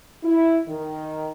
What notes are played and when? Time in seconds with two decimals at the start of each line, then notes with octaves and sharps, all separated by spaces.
0.23 E4
0.68 D#3